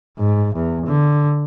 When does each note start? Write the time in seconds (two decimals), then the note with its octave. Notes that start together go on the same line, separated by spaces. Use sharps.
0.18 G#2
0.55 E2
0.86 D3